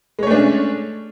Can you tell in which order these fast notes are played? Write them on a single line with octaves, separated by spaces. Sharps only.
G#3 C#5 A3 D4 C#4